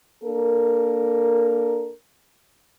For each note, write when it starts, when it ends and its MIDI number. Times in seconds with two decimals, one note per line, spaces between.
0.24 1.92 58
0.24 1.92 62
0.24 1.92 69
0.24 1.92 70